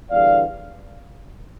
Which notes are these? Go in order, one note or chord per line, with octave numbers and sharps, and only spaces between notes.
E2 D3 G3 B3 D5 F5